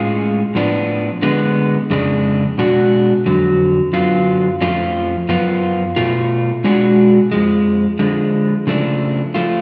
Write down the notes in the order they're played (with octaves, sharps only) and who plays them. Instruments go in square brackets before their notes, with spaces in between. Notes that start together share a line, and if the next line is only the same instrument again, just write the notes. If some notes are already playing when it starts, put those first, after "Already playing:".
Already playing: [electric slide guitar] A2 G#3 C#4 F4
A2 F3 B3 D4
D3 G#3 B3
F2 C#3 G#3 D4
B2 G#3 D4 F#4
F2 D3 F#3
F#2 D3 F#3 B3 F4
F2 F3 A3 C#4 F4
F#2 F3 B3 F4
B2 A3 F4
B2 G#3 D4 F#4
F2 F3 G#3
D3 F3 G#3
C#3 F3 A3 D4
F3 A3 F4